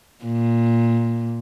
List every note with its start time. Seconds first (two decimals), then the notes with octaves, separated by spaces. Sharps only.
0.24 A#2